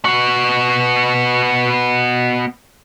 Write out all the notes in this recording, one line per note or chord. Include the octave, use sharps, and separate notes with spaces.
B3 F#4